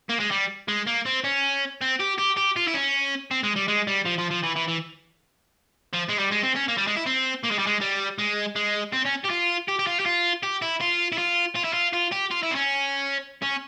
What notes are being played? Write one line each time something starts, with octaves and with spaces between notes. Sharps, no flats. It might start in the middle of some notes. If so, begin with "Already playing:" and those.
A#3
G#3
G3
G#3
A#3
C4
C#4
C4
G4
G4
G4
F4
E4
C#4
C4
G#3
G3
G#3
G3
F3
F3
F3
E3
E3
E3
F3
G#3
G3
G#3
C4
C#4
A#3
G3
G#3
E4
C4
A#3
G#3
G3
G#3
G3
G#3
G#3
C4
C#4
G4
F4
G4
G4
F4
G4
F4
G4
E4
F4
E4
F4
F4
E4
F4
F4
G4
F4
E4
C4
C#4
C#4